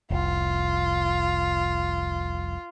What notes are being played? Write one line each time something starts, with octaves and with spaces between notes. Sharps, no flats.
F1 C2 F4